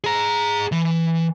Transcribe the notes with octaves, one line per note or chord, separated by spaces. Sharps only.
G#4 A#5
E3